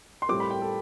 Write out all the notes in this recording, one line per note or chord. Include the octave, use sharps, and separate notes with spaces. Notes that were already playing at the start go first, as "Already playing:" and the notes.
C6
A2 G3 C4 D6
B5
G5
A4